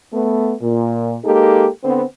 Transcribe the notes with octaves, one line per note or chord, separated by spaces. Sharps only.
A3 B3
A#2
G#3 A#3 D#4 G4 A4
D3 B3 C4